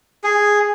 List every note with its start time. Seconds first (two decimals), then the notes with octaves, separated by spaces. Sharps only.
0.24 G#4